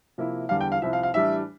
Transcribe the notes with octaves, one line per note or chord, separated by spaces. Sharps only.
C3 F3 A#3 E4
E2 D3 G3 D4 F5
G5
F5
C2 C3 F3 E5
F5
F5
A2 E3 G3 D4 E5